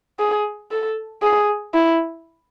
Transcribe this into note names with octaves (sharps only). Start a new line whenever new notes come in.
G#4
A4
G#4
E4